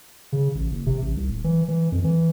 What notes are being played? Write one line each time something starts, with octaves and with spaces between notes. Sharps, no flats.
C#3
A1
F#1
C3
A1
C2
D1
E3
E3
F2
E3